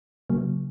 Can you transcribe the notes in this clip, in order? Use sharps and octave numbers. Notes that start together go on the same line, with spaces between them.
C#3 F#3 A#3